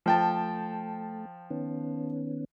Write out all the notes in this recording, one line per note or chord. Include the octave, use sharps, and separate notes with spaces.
F3 A3 G5 A5
D#3 B3 C#4